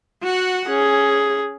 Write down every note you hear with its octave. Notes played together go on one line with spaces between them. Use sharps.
F#4 F#5
C#4 G#4